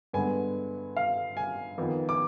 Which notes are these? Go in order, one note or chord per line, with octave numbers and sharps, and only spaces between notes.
G2 D3 G#3 B3 G#5
F5
G#5
F2 D#3 B3
D6